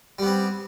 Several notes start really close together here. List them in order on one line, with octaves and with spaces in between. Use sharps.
G3 B3 C4